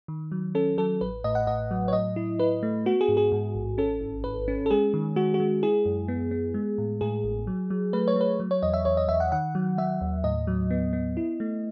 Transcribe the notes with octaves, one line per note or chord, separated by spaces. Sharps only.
D#3
F#3
C#4 A4
F#3 A4
A1 B4
A2 D#5
F#5
A2 D#5
F#3
C#5
A2 D#5
E4
E4 B4
A3
B3 F#4
G#4
G#2
G#4
G#2
A1
C#4 A4
G#1
G#1 B4
C#4
A4
G#3 G#4
D#3
G#3 F#4
F#4
G#3
E4 G#4
F#2
B3
B3
G#3
A2
A2 G#4
A1
F#3
F#3
A3 B4
C#5
A3 B4
F#3
C#5
E2 D#5
E5
E2 C#5
D#5
E2 E5
F#5
D#3 F#5
F#3
F#3 E5
D#2
A2 D#5
F#3
B3
B3
E4
A3